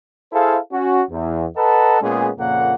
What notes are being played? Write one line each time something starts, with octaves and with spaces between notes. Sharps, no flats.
E4 G#4 A4 C5 F5
C#4 F#4
E2
A4 B4 D#5 F#5 A5 A#5
A#2 G#3 B3 C#4 G#4
F2 A#2 C#3 A#3 F#5